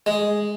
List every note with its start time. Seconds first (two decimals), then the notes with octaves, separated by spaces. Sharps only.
0.06 G#3